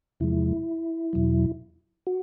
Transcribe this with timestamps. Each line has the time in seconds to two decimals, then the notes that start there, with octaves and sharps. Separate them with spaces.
0.20 E2 C3 F3 G#3 E4
1.13 E2 B2 F#3
2.07 F#4